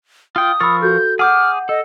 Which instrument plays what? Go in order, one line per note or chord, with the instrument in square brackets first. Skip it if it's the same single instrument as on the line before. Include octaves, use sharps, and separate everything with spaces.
[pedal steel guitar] F4 G5 [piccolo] D#6
[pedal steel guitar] F3 A#4 C#6 [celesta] B5 E6 A6
[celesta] F#4 A4 [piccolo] G6
[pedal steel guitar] G#4 D6 [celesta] F#5 G6 [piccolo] F6
[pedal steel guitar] A4 [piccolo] D#5